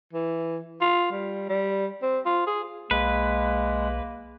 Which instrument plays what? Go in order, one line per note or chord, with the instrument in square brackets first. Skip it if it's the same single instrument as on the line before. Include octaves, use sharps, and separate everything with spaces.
[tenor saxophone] E3
F4
G3
G3
C4
F4
G#4
[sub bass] B1 [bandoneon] G#3 [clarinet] A#3 [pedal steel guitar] B4